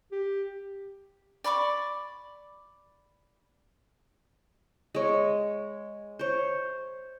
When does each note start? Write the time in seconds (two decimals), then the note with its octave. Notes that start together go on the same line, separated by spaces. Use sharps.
0.12 G4
1.44 D5 B5 C#6 D6
4.95 G#3 C#5
6.19 C5 C#5